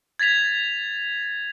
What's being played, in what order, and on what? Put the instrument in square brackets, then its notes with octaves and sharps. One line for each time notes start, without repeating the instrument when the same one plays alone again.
[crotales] G#6 A6 B6 F7